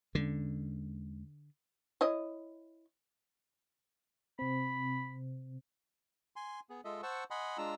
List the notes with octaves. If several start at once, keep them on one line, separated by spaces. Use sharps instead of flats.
E2 D3 G#3 C#4
E4 C#5 D#5
C3 C4 B5
G#5 C6
B3 G#4
G#3 F4 A4 D#5 E5
C5 F#5 A5 C#6 E6
D#5 F#5 G#5 B5 C6
G#3 D4 F4 A#5 E6